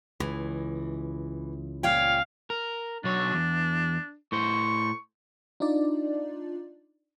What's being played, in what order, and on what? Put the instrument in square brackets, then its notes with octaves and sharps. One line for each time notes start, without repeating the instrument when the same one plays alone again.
[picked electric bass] C#2 [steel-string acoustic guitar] E3
[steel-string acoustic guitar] A#2 C#5 G5 [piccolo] F5
[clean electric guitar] A#4
[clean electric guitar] B1 F#3 C#5 [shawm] D4
[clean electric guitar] E2
[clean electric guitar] A2 C5 [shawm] C#6
[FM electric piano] D4 D#4 F4 D5